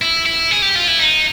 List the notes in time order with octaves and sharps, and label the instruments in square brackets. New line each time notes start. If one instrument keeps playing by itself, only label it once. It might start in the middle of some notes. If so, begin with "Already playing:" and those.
[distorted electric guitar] E4
E4
G#4
G4
F4
E4
D#4